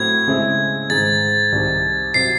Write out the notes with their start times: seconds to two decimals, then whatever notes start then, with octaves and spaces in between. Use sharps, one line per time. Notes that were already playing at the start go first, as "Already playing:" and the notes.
Already playing: A2 F#3 C4 G#6
0.27 C#3 G#3 C4 E4 G#4
0.90 G#2 D#3 G#3 A6
1.52 C2 C3 D#3
2.14 C3 F#3 C7